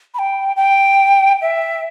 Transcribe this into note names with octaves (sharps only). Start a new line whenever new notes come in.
B5
G5
G5
E5